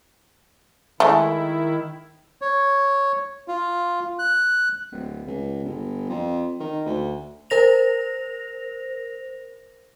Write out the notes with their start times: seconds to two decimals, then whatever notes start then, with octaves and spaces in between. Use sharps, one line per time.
1.00 D#3 G#3 A3 E4
2.42 C#5
3.48 F4
4.19 F#6
4.92 D1
5.27 C#2
5.63 G1
6.09 F2
6.60 D#3
6.86 D2
7.50 A#4 C5 A#6 F7